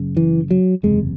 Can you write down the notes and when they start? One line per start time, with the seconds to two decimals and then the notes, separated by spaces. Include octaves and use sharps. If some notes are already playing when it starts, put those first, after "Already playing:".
Already playing: F#1 F#2 C#3
0.17 E3
0.51 F#3
0.83 F#1 E2 C3 G#3